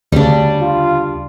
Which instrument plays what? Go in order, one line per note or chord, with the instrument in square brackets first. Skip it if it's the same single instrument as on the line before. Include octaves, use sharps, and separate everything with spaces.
[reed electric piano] D2 C#3 [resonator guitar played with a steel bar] G3 D4
[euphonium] F4